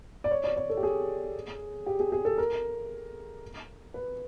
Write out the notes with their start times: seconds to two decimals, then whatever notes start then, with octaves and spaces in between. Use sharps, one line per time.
0.24 D5
0.31 C#5
0.44 D5
0.57 C#5
0.70 A4
0.77 G4
0.83 G#4
1.86 G4
2.00 G#4
2.12 G#4
2.25 A4
2.38 A#4
3.94 B4